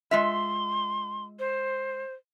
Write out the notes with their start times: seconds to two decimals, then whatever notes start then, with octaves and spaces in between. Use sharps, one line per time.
0.11 G#3 F4 E5 C6
1.39 C5